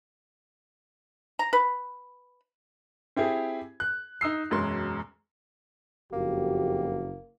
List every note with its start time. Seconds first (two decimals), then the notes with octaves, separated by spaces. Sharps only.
1.39 A#5
1.53 B4
3.16 C4 E4 G4 G#4
3.80 F#6
4.21 D#4 D#6 E6 C7
4.51 E1 F#2 G#3 C6
6.13 F#1 F2 A#3 F#4 G4